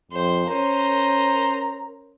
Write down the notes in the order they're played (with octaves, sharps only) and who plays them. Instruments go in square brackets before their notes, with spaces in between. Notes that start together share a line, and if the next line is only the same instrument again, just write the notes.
[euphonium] F2 [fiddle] C5
[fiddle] C#4 C5 [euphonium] A#4 [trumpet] A#5